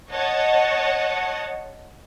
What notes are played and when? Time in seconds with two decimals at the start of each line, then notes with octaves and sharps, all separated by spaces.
0.10 C#5 D#5 F#5 A5